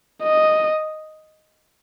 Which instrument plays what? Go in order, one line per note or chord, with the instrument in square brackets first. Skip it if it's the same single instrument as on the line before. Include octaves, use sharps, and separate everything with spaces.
[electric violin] D#5